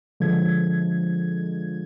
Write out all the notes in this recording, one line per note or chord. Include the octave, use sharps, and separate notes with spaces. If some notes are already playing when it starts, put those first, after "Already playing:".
D3 F3 G#3 G#6